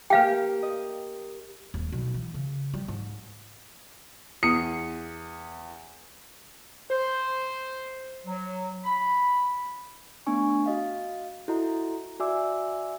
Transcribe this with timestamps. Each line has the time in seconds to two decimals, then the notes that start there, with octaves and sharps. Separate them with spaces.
0.10 A#3 G4 B4 F5 G5
0.63 D#5
1.74 D#1
1.92 B1
2.14 E3
2.34 C#3
2.74 G3
2.88 G#2
4.43 E2 D#6 C#7
6.91 C5
8.26 F#3
8.84 B5
10.27 A3 B3 D4 G#5 C#6
10.66 F#4 D#5 F5
11.48 E4 F#4 A4 D#5 A#5
12.20 F#4 D5 E5 G#5 D6 E6